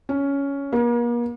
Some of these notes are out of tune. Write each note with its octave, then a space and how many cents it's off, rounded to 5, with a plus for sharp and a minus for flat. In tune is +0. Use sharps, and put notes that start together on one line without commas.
C#4 +10
A#3 +40